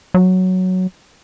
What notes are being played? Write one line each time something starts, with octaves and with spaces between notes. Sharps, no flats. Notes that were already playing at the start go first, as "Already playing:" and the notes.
F#3